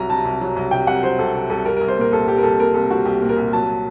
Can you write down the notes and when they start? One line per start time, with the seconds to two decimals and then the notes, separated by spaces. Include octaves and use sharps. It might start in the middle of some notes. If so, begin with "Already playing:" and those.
Already playing: C2 F#3 A#5
0.09 C3 A5
0.25 C2
0.41 F#3
0.56 C2
0.71 C3 G5
0.87 C2 F#5
1.03 F#3 C5
1.19 C2 A4
1.35 C3
1.50 C2 A4
1.65 G3 A#4
1.77 C2 A#4
1.88 C5
1.97 A#2 A#4
2.12 C2 A4
2.27 G3 G4
2.38 A#4
2.43 C2 A4
2.59 A#2 A#4
2.74 C2 A4
2.91 G3 F#4
3.05 C2 G4
3.22 A#2
3.29 A#4
3.37 C2
3.53 F#3 A5